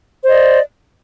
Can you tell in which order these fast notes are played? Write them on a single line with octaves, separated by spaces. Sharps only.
C5 D#5 D5